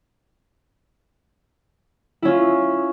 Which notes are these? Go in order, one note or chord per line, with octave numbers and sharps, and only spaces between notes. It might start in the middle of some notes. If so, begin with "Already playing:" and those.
C#4 E4 F4